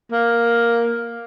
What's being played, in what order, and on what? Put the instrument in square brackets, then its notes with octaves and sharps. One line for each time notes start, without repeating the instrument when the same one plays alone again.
[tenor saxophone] A#3